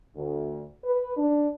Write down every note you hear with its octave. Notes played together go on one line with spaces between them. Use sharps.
D2
B4
D4